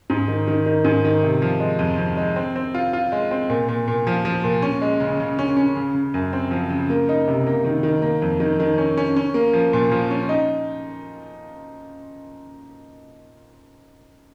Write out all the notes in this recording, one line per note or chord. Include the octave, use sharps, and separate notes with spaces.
G#2
D#3
D#3
D#3
G#2
D#3
C3
F3
G#3
F2
F2
G#3
C4
C4
F4
F4
G#3
C4
A#2
A#2
A#2
F3
F3
A#2
C#4
G#3
C#3
C#3
C#4
C#4
C#3
C#3
F#2
C4
F3
C#3
A#3
D#4
C3
A#3
D#3
D#3
A#3
F2
D#3
D#3
C#4
C#4
C#4
A#3
F3
A#2
F3
C#4
D#4